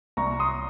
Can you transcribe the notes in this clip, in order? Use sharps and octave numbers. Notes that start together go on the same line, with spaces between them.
C2 A#5 C#6
C6 D#6